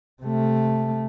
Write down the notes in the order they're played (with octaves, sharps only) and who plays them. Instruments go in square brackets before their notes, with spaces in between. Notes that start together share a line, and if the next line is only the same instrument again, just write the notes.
[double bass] C3 A3